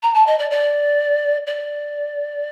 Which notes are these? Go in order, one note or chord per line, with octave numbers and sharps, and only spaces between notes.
A#5
A5
D#5
D5
D5
D5